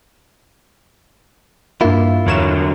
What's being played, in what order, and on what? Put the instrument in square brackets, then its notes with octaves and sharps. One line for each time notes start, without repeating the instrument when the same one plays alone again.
[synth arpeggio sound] G2 A#3 [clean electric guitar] E4 F4
[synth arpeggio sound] E2 C#5 E7 [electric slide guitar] D3 F#3 A#4